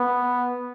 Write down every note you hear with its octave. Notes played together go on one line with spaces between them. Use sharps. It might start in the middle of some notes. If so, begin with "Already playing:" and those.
Already playing: B3